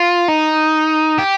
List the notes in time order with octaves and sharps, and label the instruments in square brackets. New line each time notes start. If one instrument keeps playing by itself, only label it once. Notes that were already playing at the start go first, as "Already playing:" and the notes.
Already playing: [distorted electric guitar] F4
D#4
G4